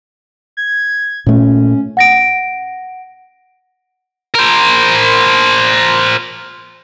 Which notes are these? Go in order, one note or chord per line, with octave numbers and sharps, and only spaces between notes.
G#6
A#2 A3 C#4
F#5 A#6 D7
A#4 C5